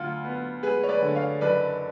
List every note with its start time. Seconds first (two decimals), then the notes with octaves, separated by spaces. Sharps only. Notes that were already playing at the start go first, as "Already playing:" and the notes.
Already playing: D2 F4
0.24 B3
0.63 G#3 G#4 B4
0.83 C#5
0.89 B4 D5
1.02 D3
1.15 C#5 F5
1.41 F#1 B4 D5